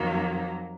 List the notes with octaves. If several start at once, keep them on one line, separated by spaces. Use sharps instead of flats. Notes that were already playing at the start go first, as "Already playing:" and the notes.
Already playing: F2 D#3 F#3 A#3